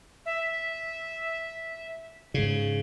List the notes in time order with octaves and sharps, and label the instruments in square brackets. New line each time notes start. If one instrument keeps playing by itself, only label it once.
[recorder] E5
[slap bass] G#2 C#3